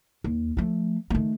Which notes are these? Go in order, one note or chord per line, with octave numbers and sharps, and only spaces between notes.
D#2
F3 A3
D#3 A3